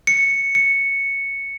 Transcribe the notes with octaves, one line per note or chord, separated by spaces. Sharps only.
C#7
C#7